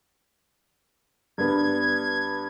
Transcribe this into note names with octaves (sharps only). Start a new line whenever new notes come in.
G2 B3 G#6